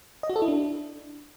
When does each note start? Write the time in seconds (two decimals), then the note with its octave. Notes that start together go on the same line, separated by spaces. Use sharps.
0.23 D#5
0.30 F#4
0.36 A4
0.42 E4
0.48 D4